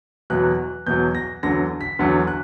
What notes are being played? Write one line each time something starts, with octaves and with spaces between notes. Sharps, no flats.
E2 B2 F#3 F#6
E2 B2 F#3 G6
A#6
E2 D3 F#3 A#6
B6
E2 D3 F#3
F#6